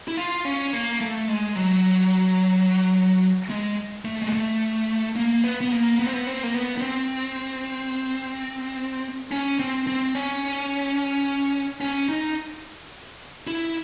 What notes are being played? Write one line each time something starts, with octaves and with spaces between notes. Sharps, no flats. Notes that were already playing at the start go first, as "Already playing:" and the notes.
E4
F4
C#4
A#3
A3
G#3
F#3
G#3
A3
G#3
A3
A#3
B3
B3
A#3
B3
C4
B3
C4
A#3
B3
B3
C4
C#4
C4
C4
C#4
C#4
D#4
E4